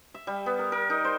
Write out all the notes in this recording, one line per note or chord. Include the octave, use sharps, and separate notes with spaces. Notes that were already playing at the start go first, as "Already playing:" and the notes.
E5
G3
B3
A#4
A#4
D#4
C5